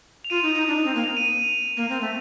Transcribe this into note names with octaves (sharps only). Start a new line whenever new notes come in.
F7
F4 D#7
D#4
D#4
D4
D#4
C4
A#3
F7
D#7
F7
A#3
C4
A3